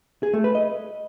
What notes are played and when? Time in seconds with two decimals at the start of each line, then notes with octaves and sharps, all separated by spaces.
0.23 G#4
0.34 A3
0.44 B4
0.55 D#5